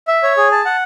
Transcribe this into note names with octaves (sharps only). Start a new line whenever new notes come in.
E5
C#5
G#4
A5
F#5